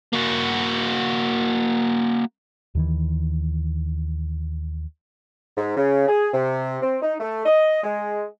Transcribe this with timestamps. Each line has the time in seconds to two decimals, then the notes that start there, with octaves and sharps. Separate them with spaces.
0.13 A#3 F#4
2.75 D#2 D#3 E3
5.57 G#2
5.77 C#3
6.08 G#4
6.33 C3
6.82 C4
7.02 D#4
7.20 A3
7.46 D#5
7.84 G#3